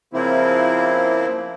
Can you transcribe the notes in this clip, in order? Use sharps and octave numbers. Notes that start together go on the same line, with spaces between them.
C#3 F3 A#3 C4 E4